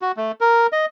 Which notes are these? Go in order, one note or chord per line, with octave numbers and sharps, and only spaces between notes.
F#4
A3
A#4
D#5